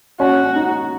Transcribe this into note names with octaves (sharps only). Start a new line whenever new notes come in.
C#4 F#4
C#4
D#4